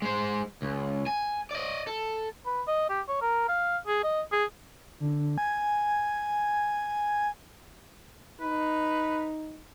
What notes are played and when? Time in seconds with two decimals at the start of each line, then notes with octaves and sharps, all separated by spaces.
0.02 G#3 C5
0.62 C#2
1.06 G#5
1.51 D5 D#5
1.87 A4
2.46 B4
2.68 D#5
2.90 G4
3.08 C#5
3.22 A#4
3.49 F5
3.87 G#4
4.04 D#5
4.32 G#4
5.00 D3
5.38 G#5
8.41 D#4 B4